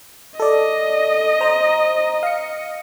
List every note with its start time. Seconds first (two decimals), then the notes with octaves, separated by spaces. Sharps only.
0.40 A4 D5 D#5
1.41 C5 A#5
2.23 F5 C#7